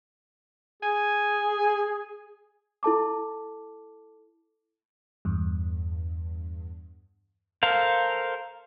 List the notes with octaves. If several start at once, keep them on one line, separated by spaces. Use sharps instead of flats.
G#4 G#5
E4 A4 A5 D6
E2 G2
A4 A#4 C5 F5